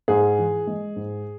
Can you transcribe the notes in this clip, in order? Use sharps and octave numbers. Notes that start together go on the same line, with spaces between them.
G#2 G#4
E3
G#3
G#2